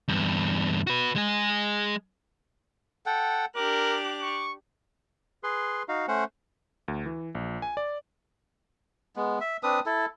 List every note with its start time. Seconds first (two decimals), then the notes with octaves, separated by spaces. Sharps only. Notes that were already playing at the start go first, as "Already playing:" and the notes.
0.08 E2 G2
0.87 F#4 B4
1.16 G#3 G#4
3.06 A4 F#5 G5
3.56 D4 G4 A#4 D6 F#6
4.22 C#6
5.44 G#4 B4 C6
5.88 D#4 F#4 F5
6.08 A3 C#4 C5 F#5
6.88 D2
7.06 E3
7.35 A#1
7.62 G#5
7.77 D5
9.16 G#3 B3
9.41 E5
9.63 C4 D4 B4 D#6
9.86 E4 A4